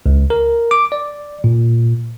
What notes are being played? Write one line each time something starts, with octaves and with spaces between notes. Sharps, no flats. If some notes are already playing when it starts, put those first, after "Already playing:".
C#2
A#4
D6
D5
A#2